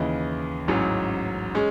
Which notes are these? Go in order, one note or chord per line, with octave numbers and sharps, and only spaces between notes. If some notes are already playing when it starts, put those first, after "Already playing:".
Already playing: D#2 C#3 E3 D#5
A1 G#2 F#3 C#4
G#3 C#4